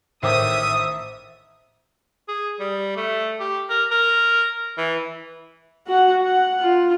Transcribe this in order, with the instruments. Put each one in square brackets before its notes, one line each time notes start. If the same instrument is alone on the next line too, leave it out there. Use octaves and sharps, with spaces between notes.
[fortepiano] A1 D#3 D6 [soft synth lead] C5 [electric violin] E5 [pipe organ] D#6
[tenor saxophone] G#4
G3
A3
G4
A#4
A#4
E3
[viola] F#4 F#5
F#5
F4